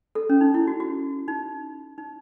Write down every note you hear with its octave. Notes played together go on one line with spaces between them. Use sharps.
A4
C#4
D#4
E4
F#4
F#4
D#4
D#4